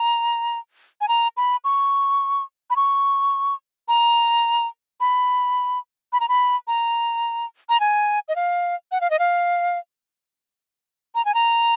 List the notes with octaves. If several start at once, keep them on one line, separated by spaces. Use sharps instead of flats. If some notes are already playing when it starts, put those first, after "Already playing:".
Already playing: A#5
G#5
A#5
B5
C#6
B5
C#6
A#5
B5
B5
A#5
B5
A#5
A#5
G#5
D#5
F5
F#5
F5
D#5
F5
A#5
G#5
A#5